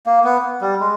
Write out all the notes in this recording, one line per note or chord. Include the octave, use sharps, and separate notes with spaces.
A#3
B3
G3
G#3